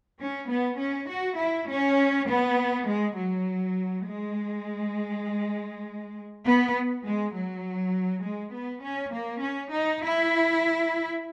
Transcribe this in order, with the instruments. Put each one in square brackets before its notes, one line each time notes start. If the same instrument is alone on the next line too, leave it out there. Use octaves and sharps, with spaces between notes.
[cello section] C#4
B3
C#4
F#4
E4
C#4
B3
G#3
F#3
G#3
B3
G#3
F#3
G#3
B3
C#4
A#3
C#4
D#4
E4